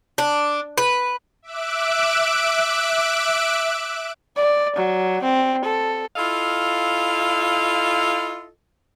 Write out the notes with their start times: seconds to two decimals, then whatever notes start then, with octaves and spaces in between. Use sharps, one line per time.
0.18 D4
0.78 B4
1.42 E5 D6 E6 F#6 D7
4.36 D5
4.76 F#3
5.23 C4
5.64 A4
6.16 E4 F4 A4 D#5 F5